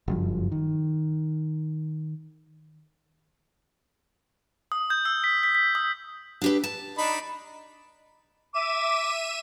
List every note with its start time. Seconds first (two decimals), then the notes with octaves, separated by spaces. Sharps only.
0.08 F#1 G2 F3
0.52 D#3
4.72 D#6
4.90 G6
5.05 E6
5.24 B6
5.43 B6
5.55 B6
5.75 D#6
6.42 D4 G4 B4
6.64 A5
6.98 D4 D#4 B5
8.54 E5 D6 D#7 E7